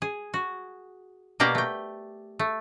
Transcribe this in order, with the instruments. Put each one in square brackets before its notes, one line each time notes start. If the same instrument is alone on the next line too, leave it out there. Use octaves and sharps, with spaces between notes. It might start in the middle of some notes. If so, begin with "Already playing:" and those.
[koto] G#4
F#4
B2 A#3 G4 D5 A#5
A3 G5
A3